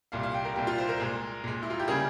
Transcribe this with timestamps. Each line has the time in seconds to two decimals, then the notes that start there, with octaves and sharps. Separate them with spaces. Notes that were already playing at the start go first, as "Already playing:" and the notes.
0.12 C2 A#2 G3 F5
0.23 F5
0.34 G5
0.45 A#4
0.56 C2 A#2 G3 G4
0.67 F4
0.78 C5
0.89 A#4
1.00 A#2 G#3
1.44 A#2 G#3
1.63 E4
1.70 F4
1.80 G4
1.88 C#3 G3 A#3 G#4